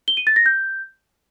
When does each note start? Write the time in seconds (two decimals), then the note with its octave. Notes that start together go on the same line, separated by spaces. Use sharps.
0.08 G7
0.17 D#7
0.27 A6
0.36 A#6
0.46 G6